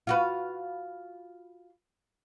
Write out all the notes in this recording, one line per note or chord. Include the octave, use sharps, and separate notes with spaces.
F4 F#4 B4